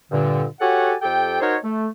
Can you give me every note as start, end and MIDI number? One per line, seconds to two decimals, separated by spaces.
0.11 0.44 43
0.11 0.44 46
0.11 0.44 50
0.60 0.94 66
0.60 0.94 67
0.60 0.94 69
0.60 0.94 73
0.60 0.94 78
0.60 0.94 80
1.02 1.39 41
1.02 1.39 67
1.02 1.39 69
1.02 1.39 79
1.41 1.55 63
1.41 1.55 66
1.41 1.55 70
1.41 1.55 72
1.41 1.55 73
1.63 1.86 57